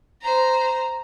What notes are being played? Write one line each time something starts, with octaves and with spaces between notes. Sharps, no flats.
C5 A#5